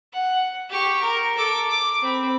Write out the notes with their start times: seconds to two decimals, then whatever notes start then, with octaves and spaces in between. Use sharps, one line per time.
0.13 F#5
0.69 G4 C#6
1.02 A#4
1.37 A4 D6
1.69 D6
2.02 C4 B5